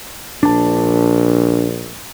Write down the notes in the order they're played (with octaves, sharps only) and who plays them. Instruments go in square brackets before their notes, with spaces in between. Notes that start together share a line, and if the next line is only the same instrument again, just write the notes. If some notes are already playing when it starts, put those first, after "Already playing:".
[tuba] A#1 [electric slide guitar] D4 A5